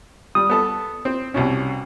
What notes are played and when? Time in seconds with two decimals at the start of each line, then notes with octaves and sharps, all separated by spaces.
0.35 G3 D#6
0.50 B3 A4 A5
1.05 C4
1.34 C2 B2 C#4